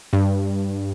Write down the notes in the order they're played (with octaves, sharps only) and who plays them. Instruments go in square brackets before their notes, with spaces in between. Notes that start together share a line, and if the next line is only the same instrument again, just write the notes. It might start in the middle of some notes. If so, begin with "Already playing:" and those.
[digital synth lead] G2